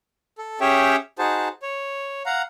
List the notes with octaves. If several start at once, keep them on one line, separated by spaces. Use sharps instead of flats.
A4
C#4 G4 G#4 C#5 E5 G5
D#4 F#4 G#4 C5 A5
C#5
F5 F#5 A#5